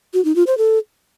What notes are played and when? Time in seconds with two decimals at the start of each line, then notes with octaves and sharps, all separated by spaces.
0.14 F#4
0.25 D#4
0.36 F4
0.47 C5
0.58 A4